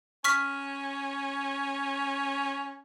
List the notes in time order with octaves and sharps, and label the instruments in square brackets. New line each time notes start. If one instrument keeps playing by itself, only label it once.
[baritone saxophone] C#4 [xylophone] C#6 F6 B6